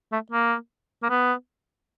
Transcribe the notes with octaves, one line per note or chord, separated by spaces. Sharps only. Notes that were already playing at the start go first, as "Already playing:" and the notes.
A3
A#3
A#3
B3